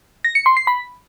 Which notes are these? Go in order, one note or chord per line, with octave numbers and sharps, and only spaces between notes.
A#6
C#7
C6
C7
B5